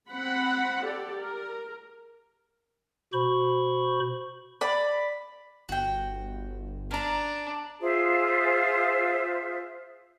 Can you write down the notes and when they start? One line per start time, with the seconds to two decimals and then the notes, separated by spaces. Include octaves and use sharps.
0.11 C4 F#5 B5
0.83 G4 A4 D5
1.18 A#4
3.13 B2 F#4 C5 B5 C#6
4.61 D5 B5
5.69 G1 F#4 G5
6.91 D4 A#4 A#5
7.80 F4 G#4 C5 E5